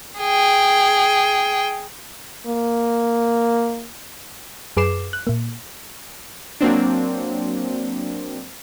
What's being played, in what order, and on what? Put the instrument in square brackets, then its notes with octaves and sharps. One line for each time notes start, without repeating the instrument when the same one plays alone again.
[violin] G#4 G5
[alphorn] A#3
[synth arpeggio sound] F#2 G#4 B4 D6 C7 E7
F#6
A#2 A#3
[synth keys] F#3 A#3 C4 D4